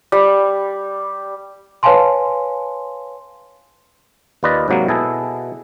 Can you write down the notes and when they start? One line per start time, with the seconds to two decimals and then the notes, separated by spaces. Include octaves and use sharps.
0.12 G3
1.83 B4 C#5 F5 G#5 A5 C6
4.43 D#2 F4 B4 D5 D#5
4.68 G#2 C3 F#3 A#3
4.88 B2 E4 G#4 A4